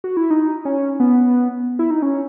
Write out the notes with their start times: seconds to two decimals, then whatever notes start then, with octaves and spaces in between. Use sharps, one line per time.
0.04 F#4
0.17 E4
0.30 D#4
0.65 C#4
1.00 B3
1.79 E4
1.90 D#4
2.02 C#4